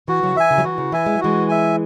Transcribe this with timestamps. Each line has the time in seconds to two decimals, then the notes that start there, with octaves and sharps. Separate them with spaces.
0.08 E3 F#4
0.23 C#3 F#3
0.36 E3 E5 G#5
0.51 C#3
0.58 F#3
0.64 E3 F#4
0.78 C#3
0.92 E3 E5 G#5
1.06 G#3
1.16 F#3
1.21 E3 G#3 F#4
1.48 E5 G#5